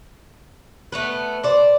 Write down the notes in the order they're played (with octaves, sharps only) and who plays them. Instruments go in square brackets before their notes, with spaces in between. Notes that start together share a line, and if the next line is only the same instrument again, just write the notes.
[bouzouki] A3 B3 B4
C5 D5